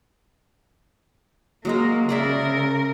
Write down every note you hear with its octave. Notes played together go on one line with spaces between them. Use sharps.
F#3 G#3 A#3 A#4
C#3 G#4 A#4 D5 E5